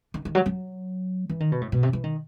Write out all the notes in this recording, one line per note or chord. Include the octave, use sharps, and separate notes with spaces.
D#3
D#3
F#3
F#3
E3
D#3
B2
A2
B2
C3
E3
D#3